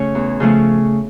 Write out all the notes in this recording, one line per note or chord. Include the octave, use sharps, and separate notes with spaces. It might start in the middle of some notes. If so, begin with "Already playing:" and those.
Already playing: C#3 A3 C#4 C#5
E2
C#3 F3 A3 C#4